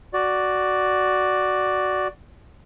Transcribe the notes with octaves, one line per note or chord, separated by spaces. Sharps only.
F#4 D5